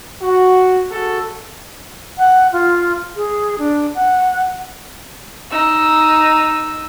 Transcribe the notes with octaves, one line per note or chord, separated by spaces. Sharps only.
F#4
F#4 G#4 A4
F#5
F4
G#4
D4
F#5
D#4 E6